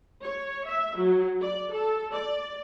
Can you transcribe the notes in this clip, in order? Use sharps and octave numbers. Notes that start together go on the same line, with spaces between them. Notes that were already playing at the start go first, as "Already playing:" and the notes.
C#5
E5
F#3
D5
A4
D5